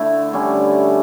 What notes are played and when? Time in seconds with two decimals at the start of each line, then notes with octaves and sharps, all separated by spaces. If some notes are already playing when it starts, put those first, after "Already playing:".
Already playing: D3 A3 E4
0.33 D3 G3 C#4